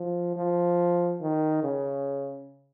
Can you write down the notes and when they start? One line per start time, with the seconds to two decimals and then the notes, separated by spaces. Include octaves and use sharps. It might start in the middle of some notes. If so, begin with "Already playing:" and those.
Already playing: F3
0.36 F3
1.21 D#3
1.63 C#3